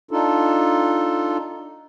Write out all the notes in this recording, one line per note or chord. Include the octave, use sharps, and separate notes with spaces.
D4 D#4 F4 A4